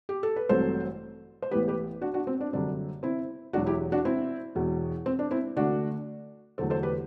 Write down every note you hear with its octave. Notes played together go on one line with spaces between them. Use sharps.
G4
A4
B4
A1 G2 F#3 C4 A4 C5
C5
A1 A2 E3 B3 G4 B4
G4 B4
D4 F#4
D4 F#4
C4
D4
F#1 F#2 D3 G3 C4 D4
C4 E4
E1 E2 B2 F#3 D4 F#4
E4 G4
D4 F#4
C4 E4
E1 E2 B2
C4
D4
C4 E4
D2 D3 A3 D4 F#4
E1 E2 D3 F#3 A3 A4 C5
A4 C5
G4 B4